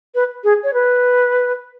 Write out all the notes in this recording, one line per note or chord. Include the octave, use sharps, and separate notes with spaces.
B4
G#4
C#5
B4